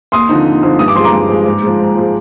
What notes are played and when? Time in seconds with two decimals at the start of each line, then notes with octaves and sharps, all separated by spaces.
0.12 D#2 C6 D#6
0.29 D3 F3 C4 D#4
0.46 D#2
0.63 D3 F3 C4 D#4
0.79 G2 D#6
0.88 D6
0.95 F3 G#3 C6
1.04 A#5 D6
1.13 G2
1.29 F3 G#3
1.46 G#2
1.62 F3 G#3
1.79 G#2
1.95 F3 G#3